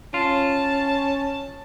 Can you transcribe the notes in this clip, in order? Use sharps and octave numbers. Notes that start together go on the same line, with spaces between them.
C#4 F4 A5